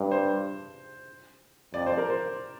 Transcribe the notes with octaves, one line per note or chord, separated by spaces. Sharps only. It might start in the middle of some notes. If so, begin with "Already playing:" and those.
Already playing: G2
C5
F2 D5
C5
A#4
C5